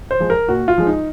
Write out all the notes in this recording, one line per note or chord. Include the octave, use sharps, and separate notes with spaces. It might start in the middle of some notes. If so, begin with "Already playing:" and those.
C5
F3 G#3
A#4
A#2 F#4
F4
F3 G#3
D#4